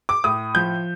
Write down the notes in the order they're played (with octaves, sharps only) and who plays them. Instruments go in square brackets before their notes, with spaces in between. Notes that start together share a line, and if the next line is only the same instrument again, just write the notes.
[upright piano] D6
A2 D#6
F3 G6